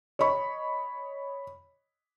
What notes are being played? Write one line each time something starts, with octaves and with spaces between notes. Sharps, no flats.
C#5 D#5 B5 C#6